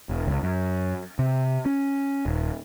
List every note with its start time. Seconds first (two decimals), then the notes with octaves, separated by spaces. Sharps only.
0.09 E1
0.27 C#2
0.43 F#2
1.19 C3
1.66 C#4
2.26 D#1